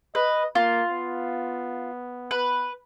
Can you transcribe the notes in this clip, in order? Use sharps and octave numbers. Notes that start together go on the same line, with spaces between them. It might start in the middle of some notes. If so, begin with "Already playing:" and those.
B4 D#5
A#3 F4
B3
B4